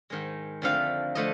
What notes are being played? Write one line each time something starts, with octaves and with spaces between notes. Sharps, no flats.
G#2 D#3 G#3
F2 D3 F3 A3 F5
D3 F3 A3 D#5